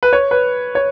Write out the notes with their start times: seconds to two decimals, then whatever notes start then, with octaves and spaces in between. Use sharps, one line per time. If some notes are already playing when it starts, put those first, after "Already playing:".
0.03 B4
0.13 C#5
0.31 B4
0.75 C#5